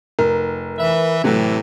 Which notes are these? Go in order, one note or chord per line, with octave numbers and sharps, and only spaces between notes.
F1 A#4
E3 B4 E5
A2 C3 E3 F#3 A3